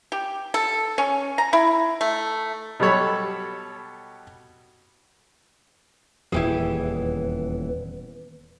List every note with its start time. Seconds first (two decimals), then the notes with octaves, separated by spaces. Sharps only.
0.12 G4
0.54 A4
0.98 C#4
1.38 A#5
1.53 E4
2.01 A3
2.80 B2 F#3 G3 A4 C#5 B5
6.32 D#1 E2 E3 E4 G4 G#4 B4